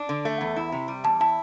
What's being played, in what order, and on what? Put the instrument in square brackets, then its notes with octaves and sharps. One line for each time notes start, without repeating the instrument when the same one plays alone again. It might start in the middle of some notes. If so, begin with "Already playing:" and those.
Already playing: [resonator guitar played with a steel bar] D4
D3
A3
E2
E4
C3
G3
[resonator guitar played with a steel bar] E2 [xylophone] A5
[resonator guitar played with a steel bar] E4 [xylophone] A5